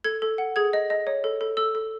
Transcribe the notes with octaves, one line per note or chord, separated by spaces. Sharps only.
A4 G#6
A4
F#5
G#4 G#6
D#5
D#5
C#5
A4
A4
A4 E6
A4